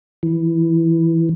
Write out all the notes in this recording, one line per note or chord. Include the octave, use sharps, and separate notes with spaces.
E3